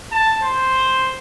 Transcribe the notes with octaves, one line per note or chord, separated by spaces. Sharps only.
A5
C5